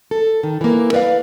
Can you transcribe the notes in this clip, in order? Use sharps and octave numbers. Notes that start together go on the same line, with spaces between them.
A4
D#3
E3 A#3
B4 D5 E5 F5